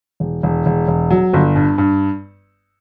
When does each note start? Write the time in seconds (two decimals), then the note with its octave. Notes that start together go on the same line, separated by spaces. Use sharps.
0.20 E1
0.43 E1
0.66 E1
0.88 E1
1.11 F#3
1.33 G1
1.56 G2
1.78 G2